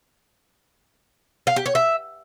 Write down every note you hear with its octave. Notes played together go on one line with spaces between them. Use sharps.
F5
G4
C#5
E5